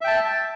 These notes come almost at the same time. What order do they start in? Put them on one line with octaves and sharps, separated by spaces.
E5 G5 A5